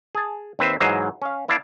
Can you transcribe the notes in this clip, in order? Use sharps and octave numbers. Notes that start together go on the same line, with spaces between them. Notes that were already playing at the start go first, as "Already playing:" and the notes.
G#4 A5
D#2 C4 B4 C5 E5
G#2 E3 F#3 C5 D#5 F5
C#4 F5
B3 E4 D5 F5 A5